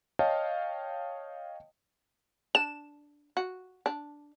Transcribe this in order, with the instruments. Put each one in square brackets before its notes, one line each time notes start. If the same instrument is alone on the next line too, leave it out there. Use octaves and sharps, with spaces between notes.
[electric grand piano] C#5 D#5 F5 G5 A5
[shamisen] D4 [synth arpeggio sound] E7
[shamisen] F#4
D4